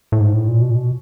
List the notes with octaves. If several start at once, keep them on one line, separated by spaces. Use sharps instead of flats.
A2
G#2
A2
A#2
B2
A#2
B2